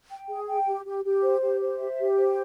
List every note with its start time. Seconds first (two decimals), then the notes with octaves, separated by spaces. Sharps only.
0.10 G5
0.28 G#4
0.48 G5
0.67 G4
0.85 G4
1.04 G4
1.22 C5
1.41 G4
1.60 C5
1.79 E5
1.98 G4
2.17 C5